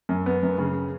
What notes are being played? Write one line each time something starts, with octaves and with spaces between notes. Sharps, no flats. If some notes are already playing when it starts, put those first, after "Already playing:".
F#2
B3
F#2
C#3